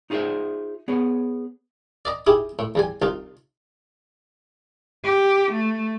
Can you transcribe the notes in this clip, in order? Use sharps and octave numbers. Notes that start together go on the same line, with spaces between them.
D#4 F4 G#4 B4 C5 E5
B3 G#4 C#5
D5 D#5 A#5
D#4 E4 G4 G#4
A2
E2 G3 G#5
C2 D#4 F4
G4
A3